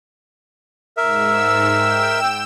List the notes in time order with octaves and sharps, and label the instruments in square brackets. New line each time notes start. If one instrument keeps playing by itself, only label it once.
[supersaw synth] G#2 E6 [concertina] A#4 E5
[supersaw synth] G5 E6 E7